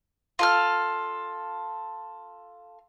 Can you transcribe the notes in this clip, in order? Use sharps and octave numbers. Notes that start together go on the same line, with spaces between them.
F4 A4 F6